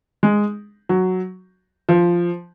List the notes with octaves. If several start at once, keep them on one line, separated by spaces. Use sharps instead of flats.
G#3
F#3
F3